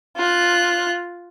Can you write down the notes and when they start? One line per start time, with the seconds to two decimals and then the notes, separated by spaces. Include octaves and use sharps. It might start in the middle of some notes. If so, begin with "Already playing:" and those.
0.16 F4 F#6